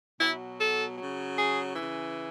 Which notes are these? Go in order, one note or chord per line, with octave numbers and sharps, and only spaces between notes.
B2 F#3 E4
A4
C#3 F#3
G#4
C#3 E3